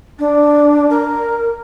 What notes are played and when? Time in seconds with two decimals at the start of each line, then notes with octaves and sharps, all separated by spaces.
0.19 D4
0.90 A#4